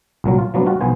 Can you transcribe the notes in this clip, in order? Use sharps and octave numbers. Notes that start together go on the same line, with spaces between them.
C2 A#2 F#3
F4
F3 F#3 B3 D4
G3 F4 F#4
B1 F3 B3 C5 G#5